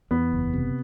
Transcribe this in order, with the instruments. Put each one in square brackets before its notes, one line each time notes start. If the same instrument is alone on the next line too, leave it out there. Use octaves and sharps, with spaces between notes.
[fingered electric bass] E2 [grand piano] B3
[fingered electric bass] F#1
C3